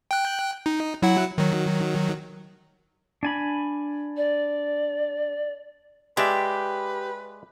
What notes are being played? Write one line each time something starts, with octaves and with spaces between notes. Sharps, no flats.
G5 F#6
D#4
F#3 E4 F#5
D#3 F#3
D4 G#5 B5
D5
G#3 G4 B4 D5 E5